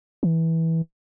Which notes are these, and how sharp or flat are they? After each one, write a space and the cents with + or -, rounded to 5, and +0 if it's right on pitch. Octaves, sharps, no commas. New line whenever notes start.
E3 -15